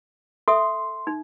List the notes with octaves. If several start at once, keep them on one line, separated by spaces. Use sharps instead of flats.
A4 E5 C6 D#6
D#4